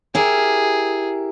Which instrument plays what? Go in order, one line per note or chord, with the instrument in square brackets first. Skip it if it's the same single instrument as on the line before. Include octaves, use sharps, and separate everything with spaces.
[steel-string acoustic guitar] E4 G4 A#4 [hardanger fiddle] G#4